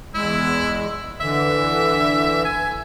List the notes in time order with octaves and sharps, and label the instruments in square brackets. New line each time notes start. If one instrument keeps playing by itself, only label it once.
[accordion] E2 G#3 [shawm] E4
[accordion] D3 E3 [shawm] E5
[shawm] G#5